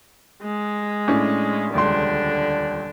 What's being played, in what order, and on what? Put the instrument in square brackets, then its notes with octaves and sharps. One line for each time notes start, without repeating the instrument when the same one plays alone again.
[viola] G#3
[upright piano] A2 C#4 D4
[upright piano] D#1 C#2 C6 [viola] D3 D4